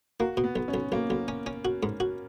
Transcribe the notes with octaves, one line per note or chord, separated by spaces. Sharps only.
A#3 F#4
B2
B3
B1
C#4
B1
B1 A#3
B1
C#4
C#4
F#4
G#2
F#4